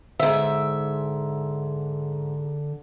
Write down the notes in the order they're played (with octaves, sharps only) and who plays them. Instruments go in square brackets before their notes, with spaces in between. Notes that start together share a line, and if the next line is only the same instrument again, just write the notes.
[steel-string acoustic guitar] G#2 E5 [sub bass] D3